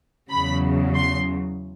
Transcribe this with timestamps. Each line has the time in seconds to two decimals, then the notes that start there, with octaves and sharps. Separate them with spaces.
0.30 E2 C#3 F#3 B5
0.95 C6